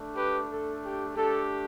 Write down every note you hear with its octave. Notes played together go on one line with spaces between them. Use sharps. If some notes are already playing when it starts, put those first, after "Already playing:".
Already playing: A3 D4
G4 B4
A4
G4
A3 D4 G4 A4